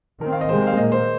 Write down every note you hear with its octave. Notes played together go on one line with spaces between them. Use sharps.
D#3 C4 A#4
F5
D#5
C3 D#3 G#3 C4 C5
F5
A#2 A#3 D#5
C5